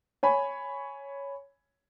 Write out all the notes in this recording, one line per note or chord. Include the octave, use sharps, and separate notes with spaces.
C#5 G#5 B5